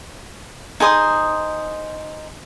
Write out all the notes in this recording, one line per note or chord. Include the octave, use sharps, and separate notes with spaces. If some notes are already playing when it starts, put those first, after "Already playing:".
D#4 G#4 C5 D#6